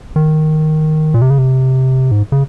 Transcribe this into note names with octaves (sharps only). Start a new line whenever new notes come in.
D#3
A#2
C3
C#3
C3
G#2
C#3